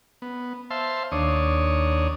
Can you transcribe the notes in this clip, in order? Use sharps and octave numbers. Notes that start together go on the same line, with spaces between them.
B3
C5 E5 F5 A5 C6
D#2 D4 C#5 D#6